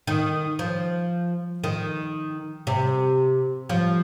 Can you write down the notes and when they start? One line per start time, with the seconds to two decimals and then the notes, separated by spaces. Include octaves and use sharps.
0.07 D#3
0.59 F3
1.64 D#3
2.67 C3
3.69 F3